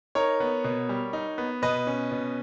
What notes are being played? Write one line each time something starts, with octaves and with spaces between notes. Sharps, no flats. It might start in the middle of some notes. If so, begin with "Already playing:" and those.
D#4 A#4 C#5
B3
B2
G3
D#4
B3
B2 B4 D#5
C#4
B2